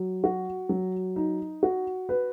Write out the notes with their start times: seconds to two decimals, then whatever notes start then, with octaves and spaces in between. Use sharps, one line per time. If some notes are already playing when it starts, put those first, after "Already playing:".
Already playing: F#3
0.24 F#4
0.69 F#3
1.16 D#4
1.63 F#4
2.09 B4